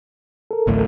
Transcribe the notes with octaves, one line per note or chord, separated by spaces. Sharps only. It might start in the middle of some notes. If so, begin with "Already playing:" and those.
A4 A#4
A1 D2 A2